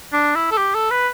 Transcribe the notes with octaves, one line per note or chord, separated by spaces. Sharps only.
D4
E4
A4
G4
A4
B4